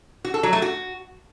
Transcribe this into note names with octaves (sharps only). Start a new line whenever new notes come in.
F#4
A4
F#3
A3
F#4